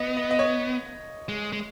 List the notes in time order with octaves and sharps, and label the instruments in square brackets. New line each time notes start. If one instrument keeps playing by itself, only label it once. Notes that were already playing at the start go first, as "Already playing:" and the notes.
Already playing: [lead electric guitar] B3 [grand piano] D#5
[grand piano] D#5
D#5
C#5
[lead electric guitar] G#3
G#3